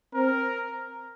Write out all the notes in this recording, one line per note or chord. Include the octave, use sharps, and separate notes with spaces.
C4 A#4